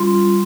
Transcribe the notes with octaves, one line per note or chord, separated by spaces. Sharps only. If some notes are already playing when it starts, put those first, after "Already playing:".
Already playing: G3 C#4 F4 C6